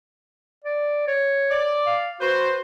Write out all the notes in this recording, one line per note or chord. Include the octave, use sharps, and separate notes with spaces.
D5
C#5
D5
F5
F#4 B4 C5